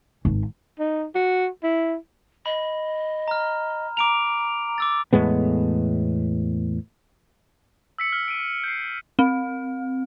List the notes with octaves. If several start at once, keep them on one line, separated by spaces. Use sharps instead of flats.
G#1
D#4
F#4
E4
D#5 B5
A#5 F6
A#5 D6 D7 F7
D6 E6 A6
E2 A2 G#3 B3
E6 B6 C#7
F6
D7 D#7
G6 C7
C4